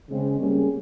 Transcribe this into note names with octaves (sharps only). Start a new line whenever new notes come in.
C#3 G#3 C4
C3 G3 A#3 C#4 G#4